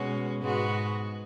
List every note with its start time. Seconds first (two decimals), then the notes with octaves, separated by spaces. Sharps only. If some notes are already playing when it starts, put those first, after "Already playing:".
Already playing: B2 G#3 C#4 F#4
0.41 G#2 G#3 B3 F#4